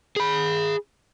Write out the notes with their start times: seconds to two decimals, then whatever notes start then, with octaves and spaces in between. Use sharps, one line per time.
0.16 G#4 B5